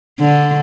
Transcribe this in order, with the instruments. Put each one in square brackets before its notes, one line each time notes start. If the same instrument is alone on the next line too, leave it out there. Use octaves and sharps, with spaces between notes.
[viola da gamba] D3